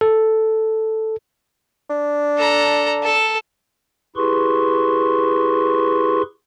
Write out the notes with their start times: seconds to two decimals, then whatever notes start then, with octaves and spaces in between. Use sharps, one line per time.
0.01 A4
1.90 D4
2.38 A4 A#5
3.03 A4 A5
4.16 E4 G4 G#4 B4 C6 C#6